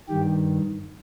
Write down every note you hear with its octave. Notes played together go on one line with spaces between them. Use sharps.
G2 D#3 G4